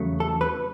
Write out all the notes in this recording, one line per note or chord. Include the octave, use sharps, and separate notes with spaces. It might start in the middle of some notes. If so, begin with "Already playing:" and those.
Already playing: E2 C#3 F#3 A3
A4
B4